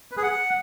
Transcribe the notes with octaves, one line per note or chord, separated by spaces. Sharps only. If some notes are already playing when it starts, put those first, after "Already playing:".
B4
G#4
F#5